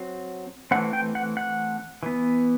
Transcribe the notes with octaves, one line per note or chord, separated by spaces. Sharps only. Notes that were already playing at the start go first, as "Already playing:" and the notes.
Already playing: F#3 C4
E3 A3 C4 F#5
G5
F#5
F#5
E3 B3